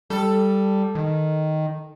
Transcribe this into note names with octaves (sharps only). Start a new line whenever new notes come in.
G3 A4
D#3